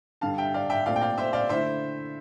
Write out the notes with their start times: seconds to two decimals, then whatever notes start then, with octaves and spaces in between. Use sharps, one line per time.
0.21 G2 D3 G3 F5 A5
0.38 E5 G5
0.54 D5 F5
0.70 E5 G5
0.86 A#2 A3 C4 F4 D5 F5
0.96 G5
1.02 D5 F5
1.18 C5 E5
1.33 D5 F5
1.49 D3 A3 E4 C5 E5